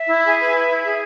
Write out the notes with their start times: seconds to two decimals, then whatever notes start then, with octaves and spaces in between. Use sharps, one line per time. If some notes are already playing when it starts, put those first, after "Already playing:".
Already playing: E5
0.09 E4
0.24 G#4
0.39 B4
0.54 E4
0.69 E4
0.84 G#4